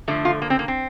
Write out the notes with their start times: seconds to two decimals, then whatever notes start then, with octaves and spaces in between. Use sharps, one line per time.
0.08 D3 F3 A3
0.25 F4
0.42 A#3
0.50 C4
0.59 A#3
0.68 C4